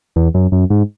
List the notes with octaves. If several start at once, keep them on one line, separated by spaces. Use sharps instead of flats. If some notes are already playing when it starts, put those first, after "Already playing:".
E2
F#2
F#2
G#2